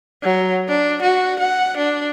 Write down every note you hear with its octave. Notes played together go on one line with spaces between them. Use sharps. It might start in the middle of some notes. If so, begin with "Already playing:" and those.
F#3
D4
F#4
F#5
D4